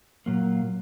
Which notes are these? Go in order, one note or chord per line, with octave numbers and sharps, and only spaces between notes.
A#2 F#3 A#3